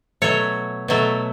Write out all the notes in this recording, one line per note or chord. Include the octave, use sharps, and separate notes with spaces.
B2 F#3 A3 C#5
B2 F#3 A3